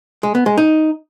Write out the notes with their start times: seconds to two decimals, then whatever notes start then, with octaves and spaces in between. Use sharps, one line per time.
0.23 G#3
0.35 B3
0.46 G#3
0.58 D#4